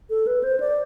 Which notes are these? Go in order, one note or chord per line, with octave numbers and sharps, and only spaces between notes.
A4
B4
C5
D5